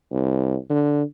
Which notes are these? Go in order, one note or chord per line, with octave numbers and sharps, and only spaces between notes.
C2
D3